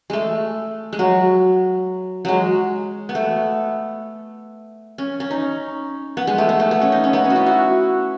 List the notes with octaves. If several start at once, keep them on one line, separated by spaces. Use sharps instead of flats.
G#3 A3
G#3
F#3
F#3 G#3
B3
A3
C#4
C#4
D#4
B3
G#3
A3
B3
A3
B3
C#4
D#4
C#4
B3
C#4
F#4
E4
F#4